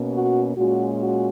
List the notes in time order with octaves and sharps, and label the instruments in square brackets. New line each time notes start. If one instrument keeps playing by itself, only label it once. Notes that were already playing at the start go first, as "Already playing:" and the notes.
Already playing: [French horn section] B2 A#3 C#4
F#4
A#2 G#3 C#4 F#4
F#4